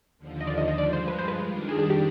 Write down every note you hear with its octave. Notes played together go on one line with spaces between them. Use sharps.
D#2 D3 F3
D#5
D5
D#5
D#5
G2 F3 G#3 D5
C5
B4
C5
B4
F2 D#3 G3 D4
G#4
G#4
G4